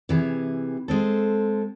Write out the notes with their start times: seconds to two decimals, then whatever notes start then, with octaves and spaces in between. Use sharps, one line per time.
0.09 C3 E3 G#4
0.88 G#3 C4 A4